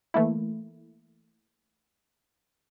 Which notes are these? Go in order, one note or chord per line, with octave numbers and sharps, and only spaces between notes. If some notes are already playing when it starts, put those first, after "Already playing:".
E3 A3 A#3 E4